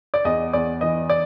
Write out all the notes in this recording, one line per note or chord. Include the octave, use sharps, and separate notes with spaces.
D5
E2 D#5
E2 D5
E3 D#5
D5